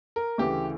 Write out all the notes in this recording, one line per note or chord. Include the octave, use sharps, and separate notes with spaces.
A#4
D2 C#3 E3 G4